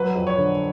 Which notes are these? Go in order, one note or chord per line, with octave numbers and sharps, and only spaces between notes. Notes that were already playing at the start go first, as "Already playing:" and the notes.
Already playing: F#3 B4
F2
C#5
D3